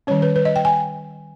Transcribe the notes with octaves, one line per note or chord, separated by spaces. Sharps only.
D#3 G3 C#4 C#5
B4
B4
D#5
G5
G#5